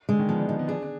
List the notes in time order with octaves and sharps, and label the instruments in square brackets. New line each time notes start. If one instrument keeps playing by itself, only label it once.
[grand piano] D3 [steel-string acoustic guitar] G#3
[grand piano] D#3
[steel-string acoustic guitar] F3 [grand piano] B3
[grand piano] D4
[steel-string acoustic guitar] F3 [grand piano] D#4
[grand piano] B3
[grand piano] D4 [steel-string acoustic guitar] G#4
[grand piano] D4